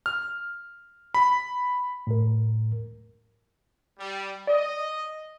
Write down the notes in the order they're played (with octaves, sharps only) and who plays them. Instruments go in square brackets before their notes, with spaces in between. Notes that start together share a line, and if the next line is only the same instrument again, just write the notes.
[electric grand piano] F6
B5
[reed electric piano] A2 A#4
[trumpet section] G3
[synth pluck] D5 [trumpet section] D#5